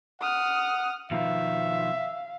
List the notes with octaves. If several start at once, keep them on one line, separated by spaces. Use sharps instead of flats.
F#5 D#6 F6
B2 D#3 F3 E5 F5